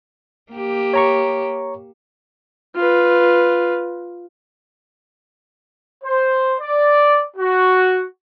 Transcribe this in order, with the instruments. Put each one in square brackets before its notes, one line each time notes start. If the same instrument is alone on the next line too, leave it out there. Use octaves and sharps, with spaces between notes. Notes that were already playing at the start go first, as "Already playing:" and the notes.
[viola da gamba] A#3 G4
[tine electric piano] C#5 A#5 C#6
[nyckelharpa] F4 B4
[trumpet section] C5
D5
F#4